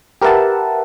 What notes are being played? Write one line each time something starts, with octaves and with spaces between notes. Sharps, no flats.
G4 A#4 B4 E5 F#5 A5